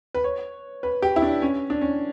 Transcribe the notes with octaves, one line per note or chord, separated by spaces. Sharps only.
B4
C#5
B4
G4
E4
D4
C#4
D4
C#4